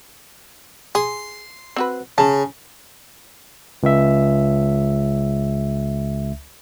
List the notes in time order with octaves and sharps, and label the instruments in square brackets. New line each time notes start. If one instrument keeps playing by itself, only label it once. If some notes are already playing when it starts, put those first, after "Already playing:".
[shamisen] G#4 [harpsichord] C6
[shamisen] C4 F#4 B4
[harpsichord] C#3 [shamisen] A5 A#5
[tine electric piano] C#2 E5